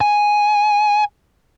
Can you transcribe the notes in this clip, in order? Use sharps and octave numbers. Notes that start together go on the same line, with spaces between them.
G#5